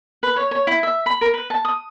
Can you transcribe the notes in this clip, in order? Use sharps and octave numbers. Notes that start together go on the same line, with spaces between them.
B4
C#5
C#5
E4
E5
B5
A#4
B4
A5
D#6